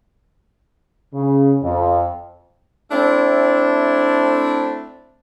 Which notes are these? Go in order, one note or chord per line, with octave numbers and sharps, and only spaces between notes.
C#3
F2
A3 C4 D4 E4